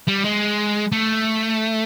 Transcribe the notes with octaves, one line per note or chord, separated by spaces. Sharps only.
G3
G#3
A3